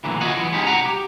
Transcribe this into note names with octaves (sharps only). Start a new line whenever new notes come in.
D2 A#2 D3 E3 F#3
F4 F#4 C#5 D#5 F#5
E3 F#3 B3
G#3 B3 C#4 D#4 G4
C2 E3 F#4 F#5 A#5
G4